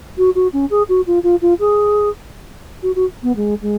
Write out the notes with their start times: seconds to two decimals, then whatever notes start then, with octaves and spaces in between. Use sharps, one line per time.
0.18 F#4
0.35 F#4
0.53 C#4
0.70 G#4
0.89 F#4
1.07 F4
1.23 F4
1.41 F4
1.60 G#4
2.83 F#4
2.96 F#4
3.23 B3
3.36 G#3
3.62 G#3